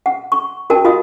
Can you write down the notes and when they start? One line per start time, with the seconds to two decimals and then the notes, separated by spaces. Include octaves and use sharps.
0.06 F#5
0.32 C#6
0.70 F#4 A#4 G5 A5
0.85 F4 F#4 D#5 F5 D#6